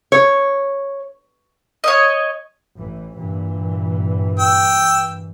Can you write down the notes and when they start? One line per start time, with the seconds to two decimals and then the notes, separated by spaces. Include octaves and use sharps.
0.12 C#5
1.84 C#5 D#5
2.76 A1 E3
3.17 G2 A#2 E3
4.39 G5 E6